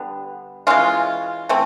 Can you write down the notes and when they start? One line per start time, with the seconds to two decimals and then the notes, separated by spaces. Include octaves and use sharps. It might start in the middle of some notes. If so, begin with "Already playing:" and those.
Already playing: D3 G3 B3
0.67 E3 G#3 C#4 F4
1.49 E3 A3 C4